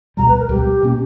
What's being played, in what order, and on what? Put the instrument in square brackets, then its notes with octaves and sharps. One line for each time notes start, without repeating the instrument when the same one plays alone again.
[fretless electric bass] C#2 B2 G3 [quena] A#5
[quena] B4
A#4
[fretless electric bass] C#2 B2 G3 [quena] G4
[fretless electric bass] B2 A#3 C#4